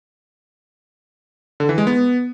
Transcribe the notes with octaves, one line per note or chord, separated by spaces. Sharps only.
D3
E3
G#3
B3